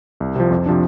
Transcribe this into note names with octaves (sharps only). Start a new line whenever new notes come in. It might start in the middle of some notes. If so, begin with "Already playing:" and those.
C2
C3 F3
F2
C3 F3 D4